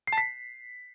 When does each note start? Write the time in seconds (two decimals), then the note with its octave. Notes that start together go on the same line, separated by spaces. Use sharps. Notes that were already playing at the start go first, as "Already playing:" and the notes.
0.07 C7
0.13 A5
0.18 B6